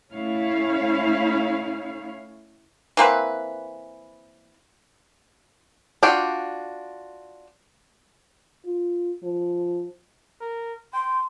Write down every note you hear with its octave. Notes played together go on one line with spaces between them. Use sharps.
A3 C#4 E4 C#5 F5
E3 A#3 C4 B4
D4 F4 F#4 G5
F4
F3
A#4
G5 C6